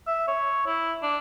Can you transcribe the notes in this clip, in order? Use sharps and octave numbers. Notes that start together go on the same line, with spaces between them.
E5
C#5
E4
D4